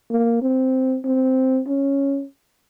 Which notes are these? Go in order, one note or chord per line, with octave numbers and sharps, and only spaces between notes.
A#3
C4
C4
C#4